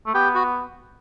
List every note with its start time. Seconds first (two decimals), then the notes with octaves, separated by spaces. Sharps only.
0.06 A3
0.14 B3 G4
0.35 F#4